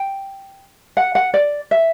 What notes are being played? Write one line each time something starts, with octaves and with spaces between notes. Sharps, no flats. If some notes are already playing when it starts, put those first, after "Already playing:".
Already playing: G5
F#5
F#5
D5
E5